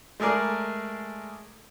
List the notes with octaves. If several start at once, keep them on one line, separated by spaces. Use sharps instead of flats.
G#3 A3 G#4 A#4 D5